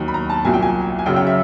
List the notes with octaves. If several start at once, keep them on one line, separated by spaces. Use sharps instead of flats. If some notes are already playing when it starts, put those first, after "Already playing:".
Already playing: D#2 D#3 F#3
B5
A#5
A5
C2 A#2 F#3 G#5
G5
G#5
G#5
F#2 C#3 F#3 G5
G5
E5